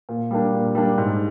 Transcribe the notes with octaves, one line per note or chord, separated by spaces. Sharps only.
A#2
G3 A#3 D4
A#2
G3 A#3 D4
G#2